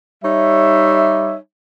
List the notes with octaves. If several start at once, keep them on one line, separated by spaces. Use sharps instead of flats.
G3 D#4 C#5 E5